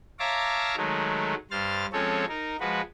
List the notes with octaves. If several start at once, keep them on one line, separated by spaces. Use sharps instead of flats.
C#5 E5 F5 A5 A#5 D6
D#3 F#3 G#3 A3
G2 C5 F6 A6
F3 G#3 C4 C#4 A4 C#5
D#4 A#4
F3 G#3 F#4 B4